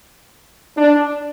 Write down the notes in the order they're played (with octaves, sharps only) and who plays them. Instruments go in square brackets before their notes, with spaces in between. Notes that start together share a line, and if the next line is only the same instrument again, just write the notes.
[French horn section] D4